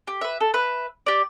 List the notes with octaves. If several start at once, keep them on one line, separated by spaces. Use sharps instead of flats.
G4
B4 E5
A4
B4 E5
G4 D5